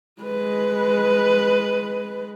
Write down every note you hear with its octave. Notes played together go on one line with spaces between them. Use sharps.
G#3 B4